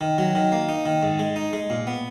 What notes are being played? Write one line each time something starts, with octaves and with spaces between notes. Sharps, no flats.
D#3
F#3
D#3
A#3
D#4
D#3
G#2
G#3
D#4
G#3
A#2
B3